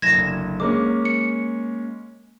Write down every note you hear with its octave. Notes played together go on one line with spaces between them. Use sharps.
F#1 D2 G#6 A#6 E7
G#3 A#3 C#4 D6
C#7